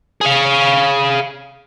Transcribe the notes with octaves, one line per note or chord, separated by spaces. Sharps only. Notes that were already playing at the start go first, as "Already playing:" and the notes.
G#4 F5